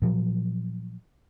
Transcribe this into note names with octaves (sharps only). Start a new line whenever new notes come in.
A#2 F3 F#3